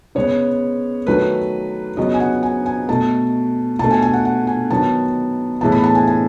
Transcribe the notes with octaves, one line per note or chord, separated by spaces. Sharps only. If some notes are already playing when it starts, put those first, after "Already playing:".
C#3 G#3 B3 C#5
D#3 F#3 A3 B4
C#3 F#3 B3 D#5
G#5
F#5
G#5
G#5
B2 A3 A5
B2 A3 A5
G#5
G#5
F#5
F#5
G#5
D#3 F#3 B3 A5
A2 E3 G#3 B3 A5
B5
A5
G#5
G#5